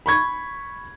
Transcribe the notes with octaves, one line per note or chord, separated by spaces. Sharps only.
B5 C#6 G#6